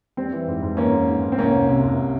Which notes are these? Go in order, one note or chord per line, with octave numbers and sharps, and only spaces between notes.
G3 C4
E3
G#2
G#2
E3 A#3 C#4
G#2
G#2
G#2
C4
C2 A#3 C#4
C2
C3
C2